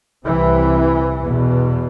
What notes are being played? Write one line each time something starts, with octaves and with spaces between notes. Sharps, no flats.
C2 C3 E3
E2 B2